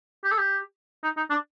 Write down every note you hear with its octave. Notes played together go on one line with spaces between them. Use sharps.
G4
A4
G4
D#4
D#4
D4